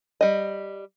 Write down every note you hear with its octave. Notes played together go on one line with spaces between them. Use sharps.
G3 D#5